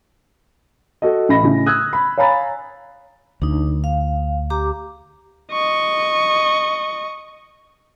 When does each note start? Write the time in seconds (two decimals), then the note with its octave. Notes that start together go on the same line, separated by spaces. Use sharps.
1.02 F#4 A4 D#5
1.29 A1 C#4 D#5 B5 A#6
1.43 A2 C#3
1.66 D#6 E6 F#6 G#6
1.93 B5
2.18 C#5 F5 G#5 A#5 B5 A6
3.42 D2 D4 D#4
3.84 F5
4.50 G4 A#5 D6
5.53 D#5 C#6